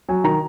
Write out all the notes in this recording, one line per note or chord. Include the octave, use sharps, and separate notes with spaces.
F#3 G#5
D#3 A#5